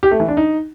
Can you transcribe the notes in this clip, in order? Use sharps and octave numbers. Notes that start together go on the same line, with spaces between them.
G4
A3
E3
D4
D#4